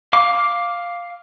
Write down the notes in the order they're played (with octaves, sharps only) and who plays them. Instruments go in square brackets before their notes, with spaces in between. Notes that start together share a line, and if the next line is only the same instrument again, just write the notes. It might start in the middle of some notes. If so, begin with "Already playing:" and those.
[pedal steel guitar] F5 D6